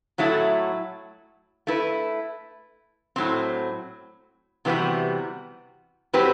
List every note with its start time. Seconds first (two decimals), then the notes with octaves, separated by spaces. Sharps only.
0.18 A2 F#3 A3 E4 A4
1.67 A3 E4 B4
3.16 A2 F#3 C4
4.65 C3 E3 G3 B3 F#4
6.13 A2 F#3 C4 G4 B4